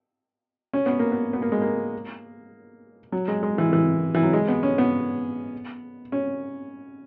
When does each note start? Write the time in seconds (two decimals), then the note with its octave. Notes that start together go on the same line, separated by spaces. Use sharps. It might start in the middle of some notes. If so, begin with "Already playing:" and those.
0.73 C#4
0.86 B3
0.99 A#3
1.12 B3
1.33 B3
1.42 A#3
1.52 G#3
1.62 A#3
3.12 F#3
3.28 G#3
3.43 G#3
3.58 E3
3.73 E3
4.14 E3
4.23 F#3
4.33 G#3
4.48 B3
4.63 C#4
4.78 B3
6.12 C#4